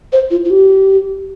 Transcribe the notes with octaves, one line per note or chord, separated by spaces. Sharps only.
C5
F4
F4
G4